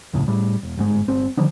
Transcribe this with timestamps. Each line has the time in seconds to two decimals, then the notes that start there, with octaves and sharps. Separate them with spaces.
0.13 E1 C#2 A2 C#3
0.28 A2 G3
0.63 E1
0.77 G1 G#2 G#3
1.08 G1 C4
1.37 D3 D#3 F3 G3